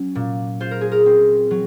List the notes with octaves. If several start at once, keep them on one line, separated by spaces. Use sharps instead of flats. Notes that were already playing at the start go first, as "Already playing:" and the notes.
Already playing: F#3 C#4
A#2
F4 C5
A#4
G#4
A#4
C4
F#3